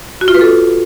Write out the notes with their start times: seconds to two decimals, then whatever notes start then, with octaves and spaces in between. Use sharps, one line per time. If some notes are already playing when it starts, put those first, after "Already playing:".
0.21 F#4
0.28 F4
0.34 B4
0.41 A4